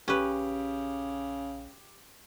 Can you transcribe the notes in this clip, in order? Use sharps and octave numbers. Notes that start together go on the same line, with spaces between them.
A#1 C#3 C#4 G4 B4